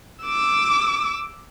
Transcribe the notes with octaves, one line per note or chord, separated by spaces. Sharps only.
D6 E6